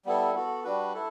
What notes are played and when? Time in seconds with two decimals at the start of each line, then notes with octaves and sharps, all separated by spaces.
0.05 G3 B3 E4 A4
0.34 B3 F#4 A4
0.64 G3 D4 F#4 B4
0.94 E4 A4